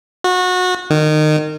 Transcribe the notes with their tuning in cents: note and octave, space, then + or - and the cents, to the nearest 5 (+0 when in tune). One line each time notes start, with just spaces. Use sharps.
F#4 -25
D#3 -25